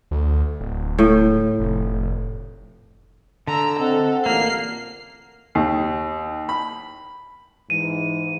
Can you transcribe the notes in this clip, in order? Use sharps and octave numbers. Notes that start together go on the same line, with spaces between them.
D2
D1
A2
F1
D3 A#5 E6
C4 A4 D#5 F#5
A1 A#2 A#3 F6 C7
D#2
B5
G#2 E3 D#7